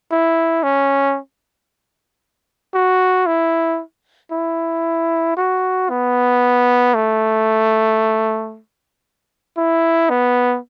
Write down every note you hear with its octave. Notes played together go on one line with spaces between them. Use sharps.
E4
C#4
F#4
E4
E4
F#4
B3
A3
E4
B3